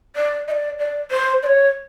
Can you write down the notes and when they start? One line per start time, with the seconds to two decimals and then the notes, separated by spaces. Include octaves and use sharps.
0.16 D5
0.48 D#5
0.51 D5
0.79 D5
1.11 C5
1.43 D5
1.46 C#5